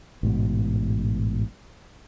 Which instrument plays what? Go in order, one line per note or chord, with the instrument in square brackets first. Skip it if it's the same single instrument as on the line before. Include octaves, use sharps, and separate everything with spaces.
[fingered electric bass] A1 G#2 B2